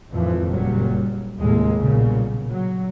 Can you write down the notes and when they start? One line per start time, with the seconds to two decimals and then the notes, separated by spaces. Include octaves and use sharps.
0.13 G#1 F2 A2 E3 F3
0.48 F#1 A#2 F#3 G3
1.40 D#2 A2 C3 G#3 A#3
1.78 B1 A#2 C#3 G3
2.50 F#3